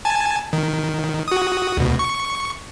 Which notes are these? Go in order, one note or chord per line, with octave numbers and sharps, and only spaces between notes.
G#5 A5
D#3
F#4 D#6
D2 B2
C#6